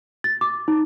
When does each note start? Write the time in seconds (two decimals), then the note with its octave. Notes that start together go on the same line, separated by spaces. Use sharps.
0.24 A6
0.41 D6
0.68 D#4